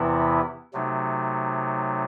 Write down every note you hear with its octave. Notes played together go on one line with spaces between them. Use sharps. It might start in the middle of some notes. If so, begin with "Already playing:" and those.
Already playing: E2 C3 E3 B3 E4
C3 F#3 A3 D#4